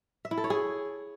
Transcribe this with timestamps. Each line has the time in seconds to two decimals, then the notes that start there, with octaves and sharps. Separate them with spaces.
0.25 E5
0.31 E4
0.37 A4
0.44 C#5
0.50 G#4